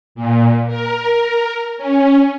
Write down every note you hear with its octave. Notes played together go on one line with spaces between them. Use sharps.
A#2
A#4
C#4